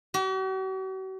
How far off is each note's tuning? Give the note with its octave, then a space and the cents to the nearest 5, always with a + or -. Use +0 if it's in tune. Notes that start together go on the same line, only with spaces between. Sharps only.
F#4 +45